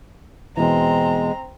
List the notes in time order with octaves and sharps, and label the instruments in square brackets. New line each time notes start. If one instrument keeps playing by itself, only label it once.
[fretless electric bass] E2 B2 E3 [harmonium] G#3 [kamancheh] C4 A#5